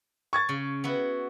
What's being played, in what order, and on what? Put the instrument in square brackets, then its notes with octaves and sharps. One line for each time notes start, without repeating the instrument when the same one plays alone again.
[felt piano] C#6 G#6 A6
[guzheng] C#3
B3 E4 F#4